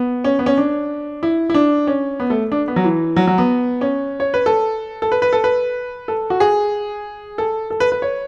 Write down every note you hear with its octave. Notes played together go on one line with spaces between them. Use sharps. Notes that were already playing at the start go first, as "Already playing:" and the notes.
Already playing: B3
C#4
B3
C#4
D4
E4
E4
D4
C#4
B3
A3
D4
B3
F#3
E3
F#3
F#3
B3
C#4
C#5
B4
A4
A4
B4
B4
A4
B4
A4
F#4
G#4
A4
A4
B4
B4
C#5